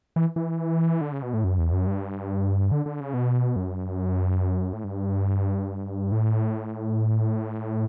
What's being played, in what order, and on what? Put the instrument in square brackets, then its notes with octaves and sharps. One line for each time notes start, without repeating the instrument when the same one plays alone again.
[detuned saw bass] E3
E3
D3
C#3
B2
A2
F#2
E2
F#2
G2
D3
D3
C#3
B2
F#2
A2
G2
A2